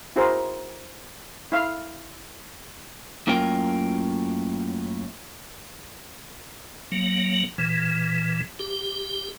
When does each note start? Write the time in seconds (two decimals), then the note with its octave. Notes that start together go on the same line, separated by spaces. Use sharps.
0.16 E4 F#4 G#4 A#4 C5
1.52 E4 F5
3.27 F#2 A2 A#3 F4 A#4 G5
6.92 F#3 A#3
7.58 A#2 E3
8.59 G4